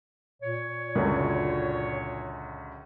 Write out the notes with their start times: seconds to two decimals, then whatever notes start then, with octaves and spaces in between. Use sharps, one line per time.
0.43 A#2 C#5
0.95 C#2 F#2 D3